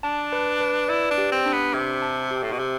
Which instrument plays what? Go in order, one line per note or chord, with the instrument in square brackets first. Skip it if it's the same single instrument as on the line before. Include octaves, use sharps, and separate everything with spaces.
[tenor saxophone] D4 [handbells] A5
[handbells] B4
B4
[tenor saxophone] E4 [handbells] D5
[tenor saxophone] D4
[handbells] G4
[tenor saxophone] C4
[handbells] D4
[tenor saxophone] B3
[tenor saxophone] C3 [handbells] G4
[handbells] A5
G4
[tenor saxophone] A2
B2
[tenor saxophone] C3 [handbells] G4